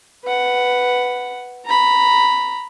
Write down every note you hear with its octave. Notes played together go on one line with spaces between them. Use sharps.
B4 F#5
A#5 B5